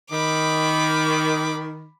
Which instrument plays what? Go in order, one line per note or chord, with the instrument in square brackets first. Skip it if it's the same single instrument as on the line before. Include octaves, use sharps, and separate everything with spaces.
[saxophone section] D#3 [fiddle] B5 D6